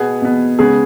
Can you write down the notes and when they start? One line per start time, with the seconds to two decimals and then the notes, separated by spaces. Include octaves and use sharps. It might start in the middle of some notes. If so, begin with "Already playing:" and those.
Already playing: B2 B3 G#4
0.22 B2 B3
0.59 C#3 G#3 B3 G#4